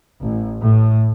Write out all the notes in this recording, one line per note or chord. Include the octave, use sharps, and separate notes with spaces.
A1
A2